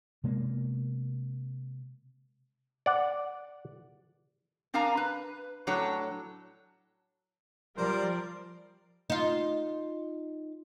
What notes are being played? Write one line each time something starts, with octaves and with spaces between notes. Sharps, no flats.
C3 G#3 A#3 B3
D5 F#5
C4 D4 A#4 F5 G#5 A#5
B4
A2 F#3 D4 A4 C#5
F3 G3 A#4 C5 D5
D#4 F4